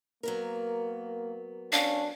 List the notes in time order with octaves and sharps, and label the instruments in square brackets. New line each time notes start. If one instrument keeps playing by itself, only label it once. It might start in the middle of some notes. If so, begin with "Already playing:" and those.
[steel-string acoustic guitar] F#3 B3 A#4 [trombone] A#3
[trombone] C#4 [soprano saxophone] D4 [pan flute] F5